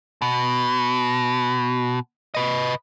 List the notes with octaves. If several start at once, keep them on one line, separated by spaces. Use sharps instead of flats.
B2
B4 D#5